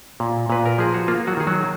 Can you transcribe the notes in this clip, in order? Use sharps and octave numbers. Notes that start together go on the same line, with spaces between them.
A#2
A#2 B4
A#4
F3 G#4
F#4
A#3 F4
F#3 F#4
D#3 G#4
F#3 F#4